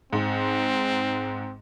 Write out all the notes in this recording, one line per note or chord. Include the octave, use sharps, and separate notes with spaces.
G#2 C4